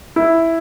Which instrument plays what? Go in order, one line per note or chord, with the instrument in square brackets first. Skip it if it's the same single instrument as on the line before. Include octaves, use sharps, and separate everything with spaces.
[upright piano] E4